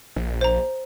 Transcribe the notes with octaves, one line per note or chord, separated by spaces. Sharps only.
A#1
C5 A#5